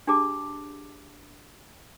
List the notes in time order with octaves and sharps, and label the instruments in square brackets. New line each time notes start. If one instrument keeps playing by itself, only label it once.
[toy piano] D4 G4 G#4 A5 D6